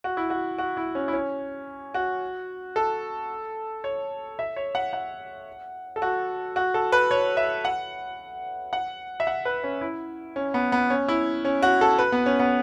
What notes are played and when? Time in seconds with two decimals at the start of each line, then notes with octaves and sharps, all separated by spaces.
0.04 F#4
0.17 E4
0.30 F#4
0.58 F#4
0.77 E4
0.95 C#4
1.08 E4
1.13 C#4
1.94 F#4
2.76 A4
3.84 C#5
4.39 E5
4.56 C#5
4.75 F#5
4.93 F#5
5.96 A4
6.02 F#4
6.56 F#4
6.74 A4
6.92 B4
7.11 C#5
7.37 E5
7.65 F#5
8.73 F#5
9.20 E5
9.27 F#5
9.45 B4
9.63 C#4
9.81 E4
10.36 C#4
10.54 B3
10.72 B3
10.90 C#4
11.08 E4
11.45 C#4
11.62 F#4
11.81 A4
11.99 B4
12.12 B3
12.26 C#4
12.40 B3